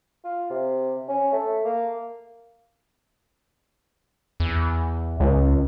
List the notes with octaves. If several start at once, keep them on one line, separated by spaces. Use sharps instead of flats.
F4
C3
C#4
A3
A#3
E2
C#2